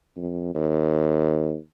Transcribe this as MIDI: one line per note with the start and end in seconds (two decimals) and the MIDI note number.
0.17 0.54 41
0.55 1.56 39